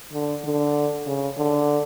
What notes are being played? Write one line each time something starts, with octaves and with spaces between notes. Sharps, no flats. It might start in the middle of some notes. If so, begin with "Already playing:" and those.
D3
D3
C#3
D3